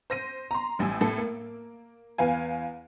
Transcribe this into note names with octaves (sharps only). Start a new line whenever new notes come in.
C5 A#6 D#7
A#5 C6
A1 A2 G3 G#5 E6
A2 A4
A#3
E2 B4 F5 G#5